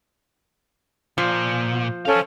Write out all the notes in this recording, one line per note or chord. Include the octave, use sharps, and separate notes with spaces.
A#2 F3
C#4 A4 C5 F5